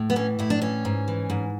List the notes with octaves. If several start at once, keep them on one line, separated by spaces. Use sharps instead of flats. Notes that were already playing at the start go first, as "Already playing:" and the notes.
Already playing: A2
B3
E3 C#4
A2 E4
D4
E3 C#4
G#2
E3
G#2